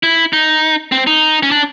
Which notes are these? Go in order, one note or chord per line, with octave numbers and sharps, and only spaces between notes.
E4
D#4
C4
D#4
C#4
D4